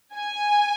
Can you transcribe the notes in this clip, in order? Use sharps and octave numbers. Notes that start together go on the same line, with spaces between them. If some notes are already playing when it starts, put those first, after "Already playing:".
G#5